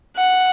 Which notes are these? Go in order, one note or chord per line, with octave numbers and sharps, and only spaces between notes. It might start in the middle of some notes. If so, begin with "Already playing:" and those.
F#5